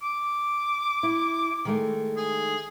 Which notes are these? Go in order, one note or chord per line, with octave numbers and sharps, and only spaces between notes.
D6
E4
D#3 G#3 A3
G#4